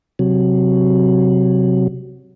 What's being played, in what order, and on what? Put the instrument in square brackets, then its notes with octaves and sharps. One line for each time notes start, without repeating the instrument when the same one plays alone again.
[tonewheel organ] C3 F#3